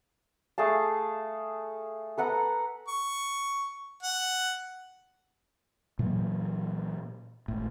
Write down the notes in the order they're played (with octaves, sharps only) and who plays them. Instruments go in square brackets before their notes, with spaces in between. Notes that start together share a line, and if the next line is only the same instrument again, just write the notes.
[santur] A3 G#4 F5 A5
A4 B4 F#5 A#5
[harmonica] C#6
F#5
[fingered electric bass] A#2 E3 F#3 A#3
G#1 A2